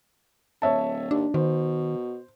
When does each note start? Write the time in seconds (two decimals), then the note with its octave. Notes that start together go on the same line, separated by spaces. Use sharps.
0.62 D1 C#5 E5 A5
1.11 D#2 D4
1.34 B2 D#3 C5